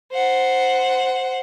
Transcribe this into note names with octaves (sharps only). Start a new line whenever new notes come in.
C5 F#5